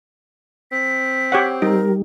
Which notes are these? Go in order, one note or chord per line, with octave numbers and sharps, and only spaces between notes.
C4 B6
G4 C#5 F#5
G3 D#4 A#4